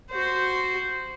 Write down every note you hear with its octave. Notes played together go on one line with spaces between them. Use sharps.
F#4 C5